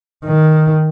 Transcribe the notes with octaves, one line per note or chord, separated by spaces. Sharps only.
D#3